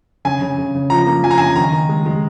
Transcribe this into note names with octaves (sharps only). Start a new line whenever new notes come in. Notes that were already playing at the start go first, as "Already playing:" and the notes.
C#3 G#5
C#3
C#3
C#3
F3 A#5
A#3
F3 G#5
A#5
G#5
C#3
D#3 A#5
D#3
G#3
G#3